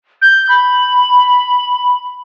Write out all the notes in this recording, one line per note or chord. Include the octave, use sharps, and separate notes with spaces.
G6
B5